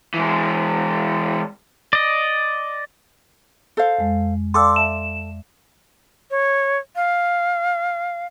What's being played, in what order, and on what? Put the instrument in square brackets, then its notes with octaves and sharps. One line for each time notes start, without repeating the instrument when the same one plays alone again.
[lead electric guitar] E3 G#3
[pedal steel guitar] D5 D#5
[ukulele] A4 C5 F5
[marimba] F2 G#3
[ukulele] A4 [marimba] D5 F5 G5 [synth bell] C6 D6 E6
[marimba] E5 A5 C6 [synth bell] E7
[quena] C#5
F5